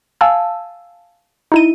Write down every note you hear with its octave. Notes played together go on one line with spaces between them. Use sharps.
F5 G#5 A5 E6
D#4 E4 D#7